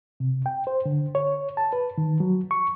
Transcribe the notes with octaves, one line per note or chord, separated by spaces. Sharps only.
C3
G5
C5
D3
C#5
A5
B4
D#3
F#3
C#6